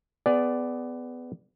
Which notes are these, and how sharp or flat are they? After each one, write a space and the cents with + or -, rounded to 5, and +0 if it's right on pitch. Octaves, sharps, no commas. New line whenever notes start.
B3 +20 G#4 +0 D5 +0